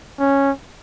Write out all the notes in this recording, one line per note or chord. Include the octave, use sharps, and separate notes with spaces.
C#4